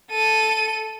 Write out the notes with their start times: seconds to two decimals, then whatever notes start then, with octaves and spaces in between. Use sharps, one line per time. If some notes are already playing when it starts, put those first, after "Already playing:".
0.11 A4 D#7